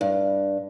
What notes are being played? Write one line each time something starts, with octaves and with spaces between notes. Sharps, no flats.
G2